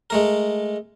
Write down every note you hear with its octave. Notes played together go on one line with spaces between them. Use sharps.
G#3 A3 A#4